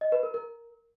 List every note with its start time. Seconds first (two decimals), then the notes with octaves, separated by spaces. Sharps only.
0.01 D#5
0.12 B4
0.23 A#4
0.34 A#4